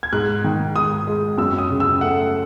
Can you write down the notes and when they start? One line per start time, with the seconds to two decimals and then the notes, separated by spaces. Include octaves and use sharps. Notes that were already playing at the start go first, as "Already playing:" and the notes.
0.03 G#6
0.13 G#2 F#6
0.44 D#3
0.76 G#2 D#6
1.07 G#3
1.38 F#2 E6
1.58 D#6
1.70 C#3
1.80 E6
2.01 A3 F#5